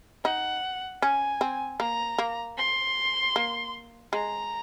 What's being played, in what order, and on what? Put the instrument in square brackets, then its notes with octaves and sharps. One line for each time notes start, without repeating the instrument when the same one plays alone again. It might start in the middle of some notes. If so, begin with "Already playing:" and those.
[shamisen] D#4 [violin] F#5
[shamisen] C#4 [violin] G#5
[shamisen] C4
[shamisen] A#3 [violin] A#5
[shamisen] A#3
[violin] C6
[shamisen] A#3
[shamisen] G#3 [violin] A#5